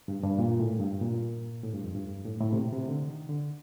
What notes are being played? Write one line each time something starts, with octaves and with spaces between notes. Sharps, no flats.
G2
G2
A#2
A2
G2
A#2
A2
G2
F2
G2
A2
A2
C3
A#2
C3
D3
D#3
D3